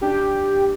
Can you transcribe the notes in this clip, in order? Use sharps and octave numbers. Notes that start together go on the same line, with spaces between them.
D4 G4